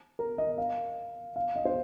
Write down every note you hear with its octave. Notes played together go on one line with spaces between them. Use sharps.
A#4
D#5
F5
F5
D#5
C5